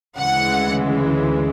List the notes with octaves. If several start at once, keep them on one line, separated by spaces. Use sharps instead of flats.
D2 C#3 E3 G#3 F#5